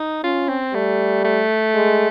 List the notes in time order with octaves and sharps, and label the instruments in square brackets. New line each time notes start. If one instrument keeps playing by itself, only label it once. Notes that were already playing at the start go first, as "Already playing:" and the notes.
Already playing: [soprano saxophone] D#4
[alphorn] C#4 [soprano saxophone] F4
[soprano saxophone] C4
[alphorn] G3 [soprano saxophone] A3
[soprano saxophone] A3
[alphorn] G#3